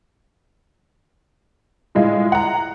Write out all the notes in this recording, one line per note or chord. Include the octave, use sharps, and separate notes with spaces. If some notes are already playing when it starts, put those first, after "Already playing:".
A2 G#3 F4
F#5 A#5